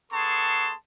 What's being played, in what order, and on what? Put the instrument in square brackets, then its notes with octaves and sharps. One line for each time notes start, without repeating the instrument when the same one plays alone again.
[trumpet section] B3 G#4 A4 A5 C6 C#6